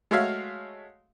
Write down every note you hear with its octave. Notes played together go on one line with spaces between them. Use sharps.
G#3 A3 F#4 C#5 E5 F5